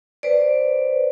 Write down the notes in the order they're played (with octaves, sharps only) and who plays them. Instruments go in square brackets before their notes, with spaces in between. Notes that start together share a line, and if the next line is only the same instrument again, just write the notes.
[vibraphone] B4 C5 D5